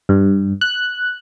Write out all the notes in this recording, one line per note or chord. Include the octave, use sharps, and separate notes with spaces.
G2
F#6